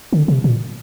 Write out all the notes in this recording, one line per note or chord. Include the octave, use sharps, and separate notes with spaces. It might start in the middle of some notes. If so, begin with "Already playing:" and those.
D3
C3
A#2